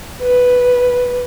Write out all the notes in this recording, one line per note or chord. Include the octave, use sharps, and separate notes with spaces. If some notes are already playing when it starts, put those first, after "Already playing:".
B4